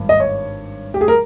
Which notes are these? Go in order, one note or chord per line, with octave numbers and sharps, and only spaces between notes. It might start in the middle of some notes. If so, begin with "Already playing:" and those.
Already playing: G#1 G2
D#5
C#5
G4
G#4
A#4